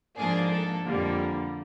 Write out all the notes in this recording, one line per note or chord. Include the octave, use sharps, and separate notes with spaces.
G#2 F3 A#3 D4 G#4
A4
F2 D3 G3 A#3